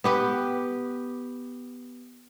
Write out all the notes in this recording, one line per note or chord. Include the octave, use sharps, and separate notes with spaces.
B3 G4 B4